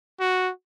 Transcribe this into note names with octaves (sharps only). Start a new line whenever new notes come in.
F#4